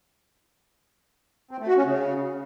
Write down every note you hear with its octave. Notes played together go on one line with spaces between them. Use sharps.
C4
A3
F#4
C#4
C#3